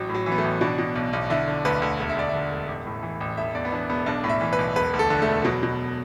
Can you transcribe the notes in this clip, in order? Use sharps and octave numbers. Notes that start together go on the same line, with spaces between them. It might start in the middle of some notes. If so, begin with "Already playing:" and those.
Already playing: A1 F#3
A2
F#3
E3
B3
A3
A1
B2 D4
B2
B1
B1
D3 E4
D3
D2 B4
D2
E1
E5
D2 D5
D3 E5
E1
A1
A2
E3
A1
E1 E5
E2 D5
B3
E3 D4
E1 B3
B1 D4
A2
E5
E3
B4
B1
E1 B4
D2
A4
D3
A3
E1
B2 F#3
B2